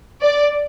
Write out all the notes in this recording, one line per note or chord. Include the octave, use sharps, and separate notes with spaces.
D5